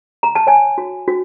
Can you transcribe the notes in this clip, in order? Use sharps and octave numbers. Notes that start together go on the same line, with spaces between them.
A#5
A5
C#5 G#5
F#4
F#4